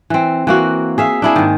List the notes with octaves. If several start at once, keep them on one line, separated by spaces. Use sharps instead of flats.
E3 C4
E3 A#3 F#4
G#4 E5 F5
D4 E4 G#4
G#2 D#3